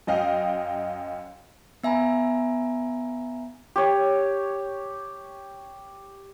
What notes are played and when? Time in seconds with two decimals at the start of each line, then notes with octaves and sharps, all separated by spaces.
0.07 F#2 D#5 F5 G5
1.84 B3 E5 G#5 A#5 B5
3.76 G4 C#5